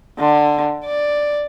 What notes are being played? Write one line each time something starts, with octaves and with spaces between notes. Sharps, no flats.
D3
D5